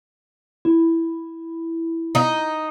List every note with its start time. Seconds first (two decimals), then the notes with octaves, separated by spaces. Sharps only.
0.65 E4
2.15 D#4